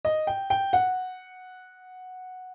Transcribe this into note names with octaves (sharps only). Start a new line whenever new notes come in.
D#5
G5
G5
F#5